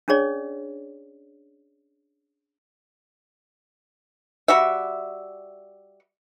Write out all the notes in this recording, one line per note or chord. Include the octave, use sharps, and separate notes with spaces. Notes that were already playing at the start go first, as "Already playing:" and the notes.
C#4 D4 G#4 C#5 D5
G3 F#4 E5